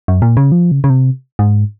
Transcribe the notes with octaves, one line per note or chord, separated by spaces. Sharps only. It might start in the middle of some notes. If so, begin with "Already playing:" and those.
F#2
A#2
C#3
F3
C#3
C#3
C3
G#2